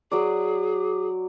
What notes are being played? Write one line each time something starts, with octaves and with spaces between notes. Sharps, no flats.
F#3 G#4 D5